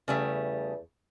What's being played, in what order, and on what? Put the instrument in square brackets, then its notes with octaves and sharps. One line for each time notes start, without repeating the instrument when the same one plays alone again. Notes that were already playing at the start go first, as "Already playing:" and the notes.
[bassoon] E2 [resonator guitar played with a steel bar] C#3 G3 A3